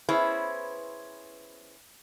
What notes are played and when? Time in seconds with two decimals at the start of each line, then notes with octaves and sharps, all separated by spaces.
0.09 B3 C#4 E4 G#4 B4 C5